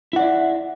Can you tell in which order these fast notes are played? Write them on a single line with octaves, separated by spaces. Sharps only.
E4 F#5 D5 E5